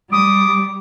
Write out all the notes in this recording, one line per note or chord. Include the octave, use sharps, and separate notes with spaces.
G3 D6 D#6